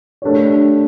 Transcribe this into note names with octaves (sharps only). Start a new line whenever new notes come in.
A3 D4 G4 C#5